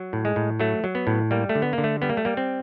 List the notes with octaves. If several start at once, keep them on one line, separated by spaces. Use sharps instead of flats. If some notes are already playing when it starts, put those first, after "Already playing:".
Already playing: F#3
A2
G#3
A2
F#3 A3
F#3
B3
A2
G3 A#3
A3
D3
B3
A#3
D3
A3
G3 B3
A#3
A3
G3 A#3
C4